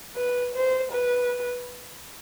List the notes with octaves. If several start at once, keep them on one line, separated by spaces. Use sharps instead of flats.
B4
C5
B4